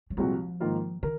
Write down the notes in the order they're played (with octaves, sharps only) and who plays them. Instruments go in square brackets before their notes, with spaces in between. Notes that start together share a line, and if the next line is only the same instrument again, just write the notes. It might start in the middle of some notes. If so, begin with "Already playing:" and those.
[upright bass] F#3
[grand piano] C2 A#2 G#3 C4 F#4 [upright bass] F3
[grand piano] G#2 D#3 A#3 F4 A#4
[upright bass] D#3 [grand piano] A#4